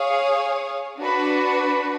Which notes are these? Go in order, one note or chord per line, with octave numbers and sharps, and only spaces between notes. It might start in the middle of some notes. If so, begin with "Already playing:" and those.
Already playing: G#4 C#5 F5
D4 F#4 B4